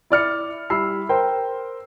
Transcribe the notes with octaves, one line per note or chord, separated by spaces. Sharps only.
E4 D5 F6 C#7
G3 E4 B5 E6 C7
A#4 C5 G5